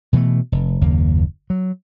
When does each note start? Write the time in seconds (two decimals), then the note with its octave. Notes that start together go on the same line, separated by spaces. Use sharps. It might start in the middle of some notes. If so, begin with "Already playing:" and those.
0.13 B2 E3 G#3 A3
0.52 F1
0.81 F#1 D#2 A#3
1.50 F#3